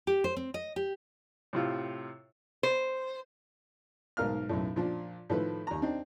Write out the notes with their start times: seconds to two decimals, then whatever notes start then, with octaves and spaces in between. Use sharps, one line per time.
0.07 G4
0.24 C5
0.37 C4
0.54 D#5
0.76 G4
1.53 A2 C3 F4
2.63 C5
4.17 B1 G#2 A#4 F5 F6
4.49 B1 F#2 A2
4.76 A#2 F3 D4
5.30 A2 D#3 F3 A4 B4
5.67 D#2 A#5
5.82 C4 D4 D#4